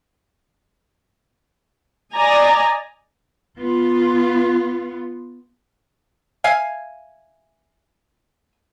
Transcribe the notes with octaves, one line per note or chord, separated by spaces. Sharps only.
D5 D#5 G#5 A#5
B3 F4
E5 F5 G#5